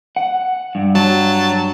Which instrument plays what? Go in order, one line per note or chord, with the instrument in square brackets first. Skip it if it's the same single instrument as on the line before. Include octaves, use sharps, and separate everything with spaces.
[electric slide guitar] F#5
G2
[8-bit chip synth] F#3 A5